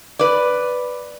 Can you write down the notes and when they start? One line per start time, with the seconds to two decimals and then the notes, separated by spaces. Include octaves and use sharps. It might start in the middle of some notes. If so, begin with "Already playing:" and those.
0.19 B4 D5